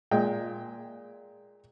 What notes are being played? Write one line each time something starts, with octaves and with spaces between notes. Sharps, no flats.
A#2 G#3 G5